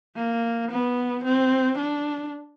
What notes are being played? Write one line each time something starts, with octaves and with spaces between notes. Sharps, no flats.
A#3
B3
C4
D4